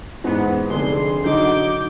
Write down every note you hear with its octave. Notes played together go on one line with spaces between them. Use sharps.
E2 G#2 B3
F1 D3 G#4 C6
D3 F#3 D#4 D6 G6